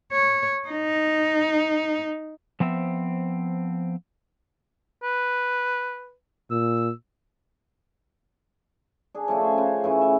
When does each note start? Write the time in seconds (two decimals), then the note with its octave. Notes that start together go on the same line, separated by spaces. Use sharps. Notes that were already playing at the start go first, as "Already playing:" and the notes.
0.13 C#5
0.68 D#4
2.60 F3 B3 C4 E5
5.03 B4
6.51 A#2 E6
9.15 D4 G#4
9.28 F3 A3 C#4
9.41 C5 G#5
9.58 C#3
9.84 A2 E3 C#4
10.01 E5